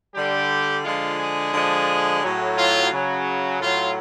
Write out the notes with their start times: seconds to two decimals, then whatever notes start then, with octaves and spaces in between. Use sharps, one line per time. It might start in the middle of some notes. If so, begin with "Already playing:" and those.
0.15 D3 G3 G4
0.84 D3 F3 G#3 F4
1.19 G#4
1.53 D3 F3 G#3
2.22 A2 F#3
2.57 F4
2.92 C#3 F#3
3.60 A2 F#3 F4